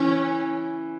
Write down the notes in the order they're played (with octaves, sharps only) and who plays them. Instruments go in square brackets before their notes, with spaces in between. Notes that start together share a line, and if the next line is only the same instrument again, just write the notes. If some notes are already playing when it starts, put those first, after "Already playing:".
Already playing: [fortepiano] E3 [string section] C#4